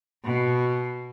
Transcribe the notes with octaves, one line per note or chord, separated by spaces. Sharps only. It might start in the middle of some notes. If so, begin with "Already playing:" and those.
B2